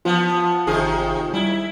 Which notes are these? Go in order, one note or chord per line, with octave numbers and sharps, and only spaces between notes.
F3 B3 F4
G#1 C3 D#3 G#4
G3 E4